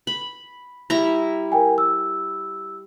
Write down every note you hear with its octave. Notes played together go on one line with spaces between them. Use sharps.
B5
G3 E4 A#5
A#4 G5 G#5
E6